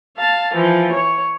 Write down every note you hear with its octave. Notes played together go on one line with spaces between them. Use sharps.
F5 A5
E3 F3
C#5